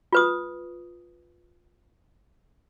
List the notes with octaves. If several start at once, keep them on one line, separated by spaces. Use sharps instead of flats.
F4 B4 D#6